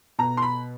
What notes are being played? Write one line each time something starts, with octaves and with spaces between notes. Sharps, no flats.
B2 A#5
C6
B5